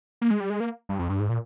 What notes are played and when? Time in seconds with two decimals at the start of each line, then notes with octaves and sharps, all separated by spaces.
0.21 A#3
0.31 G#3
0.40 G3
0.50 G#3
0.60 A#3
0.89 G2
0.99 F2
1.09 G2
1.20 G#2
1.29 A#2